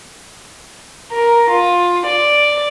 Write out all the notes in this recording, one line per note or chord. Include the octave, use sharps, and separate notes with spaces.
A#4
F4
D5